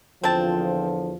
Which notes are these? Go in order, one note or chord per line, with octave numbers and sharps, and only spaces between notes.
E2 D3 F3 C4 A5